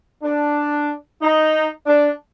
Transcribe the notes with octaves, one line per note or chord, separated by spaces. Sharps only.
D4
D#4
D4